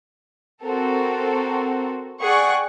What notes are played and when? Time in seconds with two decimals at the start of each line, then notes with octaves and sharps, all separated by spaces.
0.64 C4 F#4 A4 A#4
2.21 G#4 D5 F#5 G5 C#6 F#6